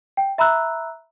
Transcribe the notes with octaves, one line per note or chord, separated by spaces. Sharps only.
G5
E5 A#5 B5 E6 F#6